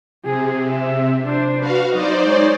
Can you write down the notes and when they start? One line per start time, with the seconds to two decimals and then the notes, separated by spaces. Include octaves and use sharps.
0.24 C3 G#4
0.68 E5
1.23 D4 C5
1.60 F#4 B4 F5
1.92 F#3 D#4 C5 D5 D#5
2.24 G#3 C#5